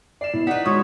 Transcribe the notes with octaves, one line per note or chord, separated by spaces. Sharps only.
D5 C7 E7
B2 E4
D#4 B4 D5 F#5 B6
F#3 G#3 C#5 C6 D#6